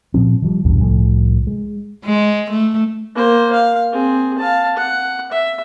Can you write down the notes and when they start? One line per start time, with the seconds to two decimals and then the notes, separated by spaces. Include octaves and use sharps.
0.14 A#2 F3 C4
0.42 D#3 F3 G3
0.65 A#1 E2 G2 B2
0.81 C2 A2 F3 A3
1.47 G#3
2.05 G#3
2.51 A3
3.15 A#3 C5
3.53 F5
3.92 C4 G#4
4.38 F5 A5
4.77 F#5
5.32 E5